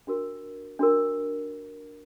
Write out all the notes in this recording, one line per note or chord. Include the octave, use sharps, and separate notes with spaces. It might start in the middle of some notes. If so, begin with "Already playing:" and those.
D4 F#4 A#4
D4 F#4 A#4